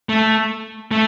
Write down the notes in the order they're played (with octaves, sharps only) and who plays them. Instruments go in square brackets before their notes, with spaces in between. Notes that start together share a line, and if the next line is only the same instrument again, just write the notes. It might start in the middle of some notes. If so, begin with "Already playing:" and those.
[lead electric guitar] A3
A3